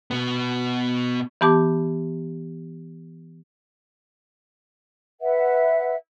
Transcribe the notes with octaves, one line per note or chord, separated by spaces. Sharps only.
B2 B3
E3 B3 G4 A5 D6
B4 E5 F#5